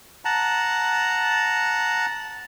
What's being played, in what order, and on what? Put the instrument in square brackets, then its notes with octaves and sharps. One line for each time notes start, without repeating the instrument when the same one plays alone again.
[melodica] F#5 A5 A#5